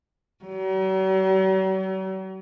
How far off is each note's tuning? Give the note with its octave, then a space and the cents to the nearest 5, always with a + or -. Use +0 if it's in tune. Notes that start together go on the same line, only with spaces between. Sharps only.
F#3 +45